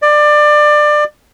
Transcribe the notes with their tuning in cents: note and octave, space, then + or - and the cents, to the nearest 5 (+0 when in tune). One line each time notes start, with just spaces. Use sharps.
D5 +25